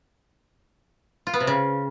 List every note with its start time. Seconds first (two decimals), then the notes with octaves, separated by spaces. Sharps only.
1.27 F4
1.34 B3
1.40 C3
1.47 C#3